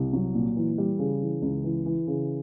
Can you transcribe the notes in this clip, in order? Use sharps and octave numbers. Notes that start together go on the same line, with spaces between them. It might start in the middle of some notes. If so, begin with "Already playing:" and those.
Already playing: C2
F#3
A#2
E3
G3
C#3
E3
C#2
E3
E3
C#3